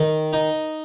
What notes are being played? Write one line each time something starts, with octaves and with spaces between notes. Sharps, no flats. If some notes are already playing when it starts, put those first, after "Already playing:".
Already playing: D#3
D#4